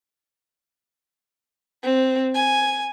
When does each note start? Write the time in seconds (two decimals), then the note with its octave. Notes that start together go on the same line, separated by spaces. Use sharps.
1.83 C4
2.35 G#5